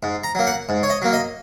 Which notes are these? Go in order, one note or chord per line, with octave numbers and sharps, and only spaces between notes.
G#2
A#5
F#3 A#3
F#5
G#2
C#5
D#5
F#3 A#3
D#5